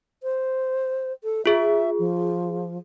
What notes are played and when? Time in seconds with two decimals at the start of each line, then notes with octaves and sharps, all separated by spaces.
0.23 C5
1.24 A4
1.46 F4 G#4 E5
1.99 F3